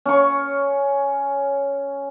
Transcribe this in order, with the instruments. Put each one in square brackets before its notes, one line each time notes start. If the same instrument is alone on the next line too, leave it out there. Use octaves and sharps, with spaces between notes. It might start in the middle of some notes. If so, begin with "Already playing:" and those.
[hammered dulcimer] C#4 C#6